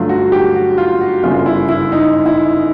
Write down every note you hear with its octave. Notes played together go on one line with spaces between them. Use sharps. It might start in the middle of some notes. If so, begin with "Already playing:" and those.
Already playing: G2 D3 F#3 A3 F4
F#4
G4
F#4
F4
F#4
G1 F#2 C#3 F4
E4
E4
D#4
E4